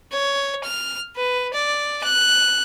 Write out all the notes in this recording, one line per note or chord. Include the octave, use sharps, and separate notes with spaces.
C#5
F6
B4
D5
F#6